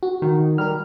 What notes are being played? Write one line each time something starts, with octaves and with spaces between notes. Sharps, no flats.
F#4
D#3
G3 A#4 F6